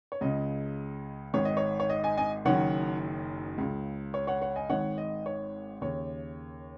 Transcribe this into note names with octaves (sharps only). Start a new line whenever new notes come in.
C#5
C#2 C#3 D#5
G#1 G#2 D#3 C#5
D#5
C#5
C#5
D#5
D#5 G#5
D#5 G#5
F#1 F#2 D#3 C#5 F#5
C#2 C#3
C#5
C#5 F#5
C#5 F#5
D#5 G#5
G#1 G#2 D#3 C#5 F#5
D#5
C#5
D#2 C#3 C#5